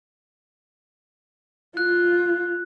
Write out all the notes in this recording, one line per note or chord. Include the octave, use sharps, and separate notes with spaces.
F4 F#6